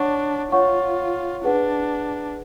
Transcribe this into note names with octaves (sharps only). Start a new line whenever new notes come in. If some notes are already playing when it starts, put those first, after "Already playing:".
Already playing: D4 C#5 F#5 C#6
F4 C#5 F#5 C#6
D4 G#4 B4 F#5